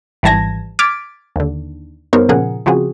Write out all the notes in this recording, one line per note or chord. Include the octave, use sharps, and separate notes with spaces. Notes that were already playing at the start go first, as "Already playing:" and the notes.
G#1 E3 G3 A5 G#6 A#6
D6 F6 G#6 A6 B6 D7
D#2 D3
G2 B3 D#4 A#4 C5 C#5
A#2 C#3 F3 G#4 A#4 F#5
C#3 F3 C4 F#4 G#4